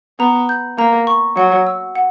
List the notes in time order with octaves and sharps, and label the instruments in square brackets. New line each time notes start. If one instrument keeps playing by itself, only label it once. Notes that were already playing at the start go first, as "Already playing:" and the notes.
[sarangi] B3 [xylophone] A#5
[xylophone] G6
[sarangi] A#3 [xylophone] A#5
[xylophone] C#6
[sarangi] F#3 [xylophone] F#5
[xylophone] E6
F#5